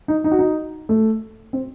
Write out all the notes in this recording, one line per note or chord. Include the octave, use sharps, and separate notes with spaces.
D#4
D#4
F#4
D#4
A3
C4